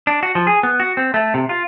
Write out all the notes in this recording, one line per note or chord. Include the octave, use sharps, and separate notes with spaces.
D4
F#4
F3
G#4
B3
F#4
C4
A3
C3
F4